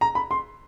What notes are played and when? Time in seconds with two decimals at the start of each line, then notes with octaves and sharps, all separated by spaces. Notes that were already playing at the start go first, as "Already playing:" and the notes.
0.01 A#5
0.15 B5
0.31 C6